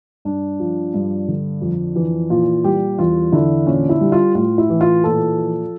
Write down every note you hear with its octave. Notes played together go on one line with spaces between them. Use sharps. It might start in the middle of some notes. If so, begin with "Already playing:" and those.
G2 D4
F3
G2
D3
F2
E3
A#2 F4
G3 G4
E2 F4
D3 E4
A#2 C#4
E4
G3
F4
A2 F4
E4
E3
F4
A#2 A4
F3